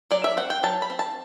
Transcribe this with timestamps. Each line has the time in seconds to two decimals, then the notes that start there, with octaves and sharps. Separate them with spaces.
0.11 F#3 D5
0.24 E5
0.37 C4 F#5
0.50 G5
0.63 F#3 A5
0.82 B5
0.90 C4
0.99 A5